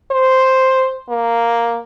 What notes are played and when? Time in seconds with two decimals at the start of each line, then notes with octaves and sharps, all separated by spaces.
0.12 C5
1.10 A#3